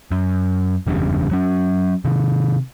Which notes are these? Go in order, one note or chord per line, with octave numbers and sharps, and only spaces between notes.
F#2
F#1 E2 G2 C#3
F#3 C#4
C3 D#3